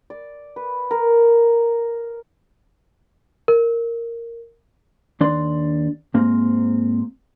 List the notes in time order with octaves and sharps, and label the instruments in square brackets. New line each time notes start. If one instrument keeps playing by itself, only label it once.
[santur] D5
B4
A#4
[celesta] A#4
[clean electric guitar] D#2 D4 D5 C6
G#2 A#3 C4